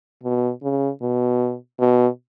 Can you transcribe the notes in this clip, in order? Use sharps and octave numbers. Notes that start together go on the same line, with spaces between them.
B2
C#3
B2
B2